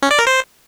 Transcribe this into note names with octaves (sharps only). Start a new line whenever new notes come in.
C#4
D5
A#4
C5